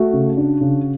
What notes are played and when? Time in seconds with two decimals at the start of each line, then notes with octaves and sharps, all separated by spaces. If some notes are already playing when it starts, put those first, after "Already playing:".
Already playing: A3 F#4
0.13 C#3
0.37 D4
0.61 C#3